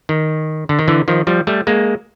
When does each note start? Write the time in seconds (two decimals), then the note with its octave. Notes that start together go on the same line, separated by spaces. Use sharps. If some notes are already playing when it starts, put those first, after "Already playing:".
0.09 D#3
0.69 D3
0.79 D#3
0.88 D3 E3
1.08 D#3 F3
1.27 F3 G3
1.47 G3 A3
1.67 G#3 A#3